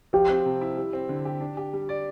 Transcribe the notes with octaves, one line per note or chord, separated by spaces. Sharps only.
F3 G4
C4
C3
E4
G3
C4
D3
G4
D4
G4
G3
D5